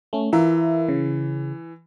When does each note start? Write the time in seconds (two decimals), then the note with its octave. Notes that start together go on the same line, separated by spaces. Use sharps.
0.13 A3 C#4
0.33 E3 F4 A#4 E5
0.89 C#3